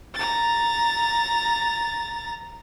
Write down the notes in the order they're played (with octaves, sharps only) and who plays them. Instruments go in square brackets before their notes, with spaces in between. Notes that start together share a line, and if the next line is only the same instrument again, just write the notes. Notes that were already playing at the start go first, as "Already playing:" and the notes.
[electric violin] A#5 A6